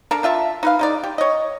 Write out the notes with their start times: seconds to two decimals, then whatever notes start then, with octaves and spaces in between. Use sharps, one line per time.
0.11 D4 A4 A#4
0.23 D4 F4 E5 A5
0.63 D#4 B4 F5
0.79 G#3 D#4 D5
1.03 G4
1.18 C#5 D#5